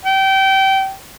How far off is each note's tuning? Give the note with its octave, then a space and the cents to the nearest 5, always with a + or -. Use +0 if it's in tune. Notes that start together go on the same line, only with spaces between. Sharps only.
G5 -25